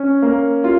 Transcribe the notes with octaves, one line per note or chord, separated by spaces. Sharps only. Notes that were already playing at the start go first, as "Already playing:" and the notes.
Already playing: C#4
A#3
F4